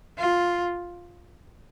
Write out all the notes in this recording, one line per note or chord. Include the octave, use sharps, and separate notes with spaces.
F4